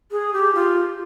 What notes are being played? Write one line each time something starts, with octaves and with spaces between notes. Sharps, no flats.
G#4
G4
F4